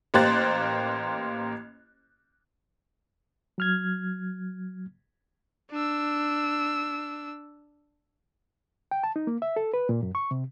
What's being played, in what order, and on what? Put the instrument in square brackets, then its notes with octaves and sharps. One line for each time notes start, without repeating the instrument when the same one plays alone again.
[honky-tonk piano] A1 A#3 G4 C5 F#6 A6
[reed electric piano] F#3 F6 G#6
[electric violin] D4 E6
[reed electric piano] G5
A5
D#4
A#3
E5
A4
B4
A#2
F#2
C#6
C3